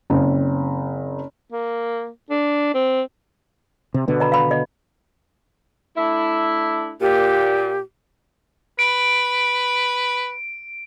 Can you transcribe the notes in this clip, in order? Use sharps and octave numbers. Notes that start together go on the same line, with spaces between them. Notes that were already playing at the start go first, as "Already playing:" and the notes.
F#1 C4
A#3
D4
C4
C3
B2 D3 B3
D#5 A#5 B5
F5 B5
D#5
A3 D4 E4
A#2 G4
B4 D7